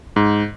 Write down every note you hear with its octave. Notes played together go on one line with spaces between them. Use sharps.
G#2